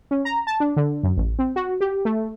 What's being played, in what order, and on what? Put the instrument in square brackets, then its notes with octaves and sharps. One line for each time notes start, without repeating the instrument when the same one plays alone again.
[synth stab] C#4
A#5
A5
D4
D3
F#2
A1
C4
F#4
G4
A3